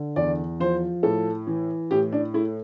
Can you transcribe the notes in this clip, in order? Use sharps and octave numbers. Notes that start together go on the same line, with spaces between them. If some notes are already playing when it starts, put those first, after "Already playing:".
Already playing: D3
E2 D5
F3 C5
A2 A4
E3
A2 G4
D4
A3 E4